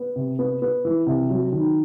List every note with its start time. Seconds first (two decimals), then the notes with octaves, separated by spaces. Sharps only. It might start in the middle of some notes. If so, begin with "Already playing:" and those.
Already playing: B3
0.16 C3
0.39 B3
0.62 B3
0.85 E3
1.06 C3
1.30 F#3
1.52 D#3